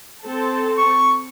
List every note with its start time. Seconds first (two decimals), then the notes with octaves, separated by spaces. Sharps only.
0.23 C4 A4 A5
0.78 C#6